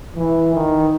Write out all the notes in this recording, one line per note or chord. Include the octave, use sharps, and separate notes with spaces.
E3
D#3